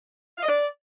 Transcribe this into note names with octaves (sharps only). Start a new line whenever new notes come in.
F5
D#5
D5